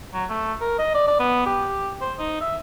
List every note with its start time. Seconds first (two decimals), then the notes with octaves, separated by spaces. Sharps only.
0.13 F#3
0.30 A3
0.61 A#4
0.78 D#5
0.95 D5
1.08 D5
1.20 B3
1.46 G4
2.01 C5
2.19 D#4
2.41 E5